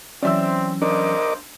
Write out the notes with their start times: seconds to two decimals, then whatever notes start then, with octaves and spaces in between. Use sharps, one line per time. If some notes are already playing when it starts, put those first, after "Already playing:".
0.23 E3 F#3 C4 C#4 D5 E5 E6
0.82 B1 G2 D4 A#4 C5 D#5 D6